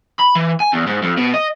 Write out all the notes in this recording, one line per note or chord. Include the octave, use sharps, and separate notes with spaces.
B5
E3
G#5
E2
G#2
F2
B2
D#5